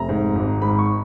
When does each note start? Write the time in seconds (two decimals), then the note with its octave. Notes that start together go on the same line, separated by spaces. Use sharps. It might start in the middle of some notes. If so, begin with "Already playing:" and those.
Already playing: F1 A#5
0.09 G#2
0.35 G#1
0.62 G#2 B5
0.78 C#6